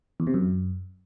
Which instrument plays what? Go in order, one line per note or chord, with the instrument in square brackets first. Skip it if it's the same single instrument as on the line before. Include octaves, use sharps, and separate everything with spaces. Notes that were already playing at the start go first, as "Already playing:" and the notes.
[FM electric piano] E2
C3
F#2